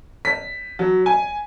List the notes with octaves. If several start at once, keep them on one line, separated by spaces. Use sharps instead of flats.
B6
F#3
G#5